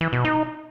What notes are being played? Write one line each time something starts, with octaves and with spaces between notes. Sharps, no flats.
E3
B2
D#4